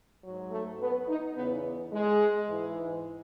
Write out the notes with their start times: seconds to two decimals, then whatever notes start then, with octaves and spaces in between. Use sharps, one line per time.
0.24 G#2 F#3
0.51 A3
0.80 B3
1.08 D#4
1.35 E2 C#3 E3 B3
1.92 G#3
2.49 G#2 E3